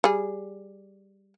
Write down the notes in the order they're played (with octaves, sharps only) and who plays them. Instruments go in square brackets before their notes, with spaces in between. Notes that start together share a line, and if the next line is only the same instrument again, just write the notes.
[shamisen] G3 G#4